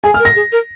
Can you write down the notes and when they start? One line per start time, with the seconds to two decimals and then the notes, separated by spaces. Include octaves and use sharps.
0.04 G#4 G#5
0.14 F6
0.20 A#4
0.25 A#6
0.36 G#4
0.52 A#4